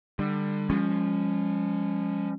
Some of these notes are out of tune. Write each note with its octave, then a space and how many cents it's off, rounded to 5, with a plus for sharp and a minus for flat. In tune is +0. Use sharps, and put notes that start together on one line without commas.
D3 +30 G3 +20
F3 +0 G#3 -35 C#4 +0